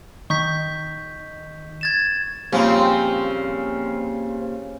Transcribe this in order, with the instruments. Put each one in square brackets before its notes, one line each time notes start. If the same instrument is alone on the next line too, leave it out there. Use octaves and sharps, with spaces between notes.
[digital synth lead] D#3 [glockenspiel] C#6 G6 B6
[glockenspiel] G#6 A6 E7
[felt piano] A#2 G3 [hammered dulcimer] C#3 G#5 C6 [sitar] F3 [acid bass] C4